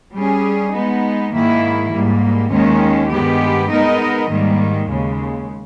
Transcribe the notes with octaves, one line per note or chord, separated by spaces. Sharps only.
G3 C#4 G#4
G#3 B3 D#4
G#2 D#3 A#3 E4
G#2 G3 A#3
D#2 D#3 G#3 C#4
G2 D#3 G#3 B3 G4
G#3 B3 D#4 A#4 D#5
G#2 D#3 G3 A#3
D#2 C#3 G#3